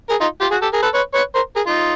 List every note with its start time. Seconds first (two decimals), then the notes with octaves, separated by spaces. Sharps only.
0.09 G#4 A#4
0.21 D#4 F4
0.41 F4 G4
0.51 F#4 G#4
0.62 G4 A4
0.73 G#4 A#4
0.83 A4 B4
0.94 B4 C#5
1.14 B4 C#5
1.35 A#4 C5
1.56 G#4 A#4
1.66 D#4 F4